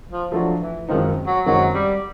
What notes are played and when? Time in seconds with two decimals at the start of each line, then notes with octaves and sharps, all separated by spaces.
0.12 F3
0.32 F3 F#3 A3 D4 F4
0.60 E3
0.89 F#2 D#3 F3 G#3 C4 D#4
1.27 F#3
1.46 F#2 D#3 F#3 G#3 C4 D#4
1.75 G3